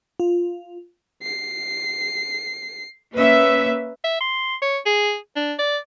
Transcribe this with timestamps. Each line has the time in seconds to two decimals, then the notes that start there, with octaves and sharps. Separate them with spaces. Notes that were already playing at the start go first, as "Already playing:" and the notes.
0.20 F4
1.23 C7
3.15 A#3 C#4 B4 E5
4.04 E5
4.21 C6
4.62 C#5
4.86 G#4
5.36 D4
5.59 D5